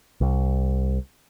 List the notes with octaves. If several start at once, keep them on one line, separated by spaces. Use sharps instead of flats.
C2